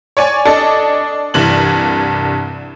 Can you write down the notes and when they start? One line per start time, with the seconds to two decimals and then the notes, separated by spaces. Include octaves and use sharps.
0.17 C#5 D5 G#5
0.45 D4 A4 D#5
1.34 C2 G2 E3 F#7